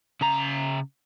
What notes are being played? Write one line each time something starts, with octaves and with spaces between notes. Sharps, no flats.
C#3 A#5